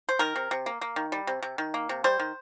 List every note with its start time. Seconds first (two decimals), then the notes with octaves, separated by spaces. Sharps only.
0.09 C5
0.19 D#3 A#4
0.36 C3
0.51 C3
0.66 A#3
0.81 A#3
0.96 D#3
1.12 G3
1.27 C3
1.43 C3
1.58 D#3
1.74 A#3
1.89 C3
2.04 G3 C5
2.20 D#3